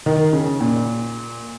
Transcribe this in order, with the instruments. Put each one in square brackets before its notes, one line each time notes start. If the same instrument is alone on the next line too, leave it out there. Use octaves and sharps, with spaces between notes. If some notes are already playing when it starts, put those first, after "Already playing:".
[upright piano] D#3
C#3
A#2